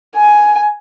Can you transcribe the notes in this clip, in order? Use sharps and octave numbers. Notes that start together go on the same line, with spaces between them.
G#5